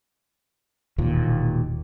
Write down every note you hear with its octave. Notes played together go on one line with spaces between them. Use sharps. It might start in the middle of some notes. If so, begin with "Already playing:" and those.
E1 D#2 A#2